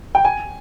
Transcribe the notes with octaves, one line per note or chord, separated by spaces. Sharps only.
G5
G#5